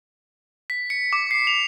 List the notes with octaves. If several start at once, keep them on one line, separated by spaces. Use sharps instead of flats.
B6
C#7
D6
C7
F7